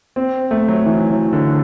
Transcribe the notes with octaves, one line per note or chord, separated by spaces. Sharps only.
C4
A3
F#3
E3
F#3
D3